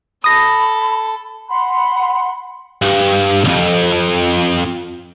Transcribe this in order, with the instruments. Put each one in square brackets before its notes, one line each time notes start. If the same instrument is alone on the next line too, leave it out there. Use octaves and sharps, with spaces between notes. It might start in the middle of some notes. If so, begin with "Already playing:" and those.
[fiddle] A4 [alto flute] B5 [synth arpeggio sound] D#6 A#6
[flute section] F#5 B5 C6
[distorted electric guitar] G2
B1 F2